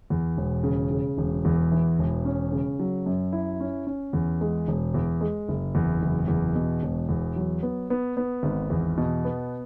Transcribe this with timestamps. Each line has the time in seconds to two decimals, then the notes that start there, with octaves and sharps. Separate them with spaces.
0.10 E2
0.37 E1
0.64 C#3
0.91 C#3
1.18 E1
1.45 E2
1.72 E3
1.99 E1
2.25 C#4
2.52 C#3
2.79 F#3
3.06 F#2
3.33 E4
3.60 C#4
3.87 C#4
4.13 E2
4.41 G#3
4.68 E1
4.94 E2
5.21 G#3
5.48 F#1
5.75 E2
6.02 F#1
6.28 E2
6.55 B2
6.83 E1
7.09 E2
7.36 F#3
7.63 B3
7.90 B3
8.17 B3
8.43 G#1
8.70 E2
8.97 B2
9.25 B3